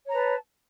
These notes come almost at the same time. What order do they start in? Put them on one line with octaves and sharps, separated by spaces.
C#5 A#5 B4 A5